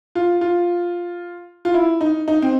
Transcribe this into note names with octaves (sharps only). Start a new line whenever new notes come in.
F4
F4
F4
E4
D#4
D#4
C4